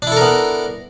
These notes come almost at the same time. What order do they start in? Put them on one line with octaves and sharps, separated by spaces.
D4 E4 A4 A#4 B3